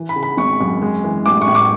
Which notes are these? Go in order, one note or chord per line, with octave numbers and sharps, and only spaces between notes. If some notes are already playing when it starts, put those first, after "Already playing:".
Already playing: E3
B5
C#3
B5
G#1 C#6
F#2
G#3
E3
A1 D6
C#6
A2
D6